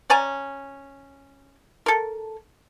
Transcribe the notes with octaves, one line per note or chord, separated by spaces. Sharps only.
C#4 D5 G#5 A#5
A4 A#4